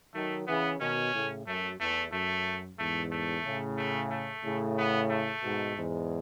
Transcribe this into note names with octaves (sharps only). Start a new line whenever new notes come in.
D#3 F#3 A3
C#3 E3 B3
B2 D#3 C#4
A2 C#3
F#2 A3
E2 A3
F#2 A3
E2 G#2 A3
A3
A2 C#3
A3
A3
A2 C#3
B3
A3
G#2 B2
E2 G#2